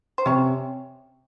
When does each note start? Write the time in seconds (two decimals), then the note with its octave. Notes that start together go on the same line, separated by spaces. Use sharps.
0.18 C5
0.26 C3 C#4 C#5